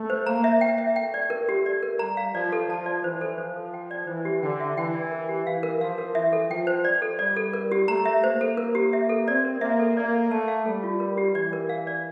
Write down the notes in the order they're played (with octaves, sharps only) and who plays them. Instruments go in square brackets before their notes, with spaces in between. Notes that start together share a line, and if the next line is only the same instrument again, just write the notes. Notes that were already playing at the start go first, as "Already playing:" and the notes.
Already playing: [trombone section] A3
[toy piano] C5
[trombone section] A#3 [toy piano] A#5
[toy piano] E5
[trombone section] A#3 [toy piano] G5
[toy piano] E5
[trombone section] A3 [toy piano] G5
[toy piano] D5
A#4
G4
D5
A#4
[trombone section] G3 [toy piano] A#5
[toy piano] F5
[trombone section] F3 [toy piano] D5
[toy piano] A4
[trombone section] F3 [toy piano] A5
[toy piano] D5
[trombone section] E3 [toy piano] C5
[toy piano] A4
[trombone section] F3 [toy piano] C5
[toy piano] A4
G5
D5
[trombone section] E3 [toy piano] C5
[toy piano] G4
[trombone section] D3 [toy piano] G5
[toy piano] E5
[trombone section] E3 [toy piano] G5
[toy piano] D5
A#4
G4
[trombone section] E3 [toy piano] F5
[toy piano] A#4
[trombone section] F3 [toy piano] F5
[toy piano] A#4
[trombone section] E3 [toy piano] E5
[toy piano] A4
[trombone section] F3 [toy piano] G5
[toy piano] C5
D5
A4
[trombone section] G3 [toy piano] D5
[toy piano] A4
A#4
G4
[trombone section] A3 [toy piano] A#5
[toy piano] E5
[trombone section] A#3 [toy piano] C5
[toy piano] A4
A#4
G4
E5
A4
[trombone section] C4 [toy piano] D5
[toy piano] A#4
[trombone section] A#3 [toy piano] E5
[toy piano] A4
[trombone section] A#3 [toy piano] D5
[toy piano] A4
[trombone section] A3 [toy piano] A5
[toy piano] F5
[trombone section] G3 [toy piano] A4
[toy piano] F4
A#4
G4
[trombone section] E3 [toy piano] D5
[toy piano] A#4
F5
D5